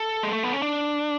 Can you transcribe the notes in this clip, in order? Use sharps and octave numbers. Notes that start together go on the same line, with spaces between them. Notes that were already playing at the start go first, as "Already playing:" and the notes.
Already playing: A4
G#3
A3
B3
C#4
D4